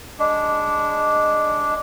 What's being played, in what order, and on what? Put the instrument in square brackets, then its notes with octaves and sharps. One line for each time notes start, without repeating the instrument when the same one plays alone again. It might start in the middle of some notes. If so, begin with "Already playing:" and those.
[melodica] G#3 D4